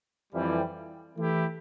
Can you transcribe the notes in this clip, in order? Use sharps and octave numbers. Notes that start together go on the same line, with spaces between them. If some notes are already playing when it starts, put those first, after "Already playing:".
F2 E3 G3
E3 A3 E4 G4